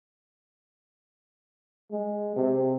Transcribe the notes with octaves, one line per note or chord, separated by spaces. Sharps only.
G#3
C3